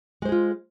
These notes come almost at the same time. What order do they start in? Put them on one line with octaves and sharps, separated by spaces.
G#3 C5 G#4 F4